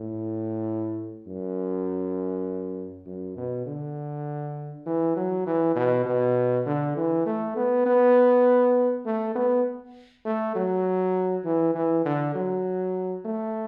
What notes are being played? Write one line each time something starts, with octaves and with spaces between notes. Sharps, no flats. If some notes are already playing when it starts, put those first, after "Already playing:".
Already playing: A2
F#2
F#2
B2
D3
E3
F#3
E3
B2
B2
D3
E3
A3
B3
B3
A3
B3
A3
F#3
E3
E3
D3
F#3
A3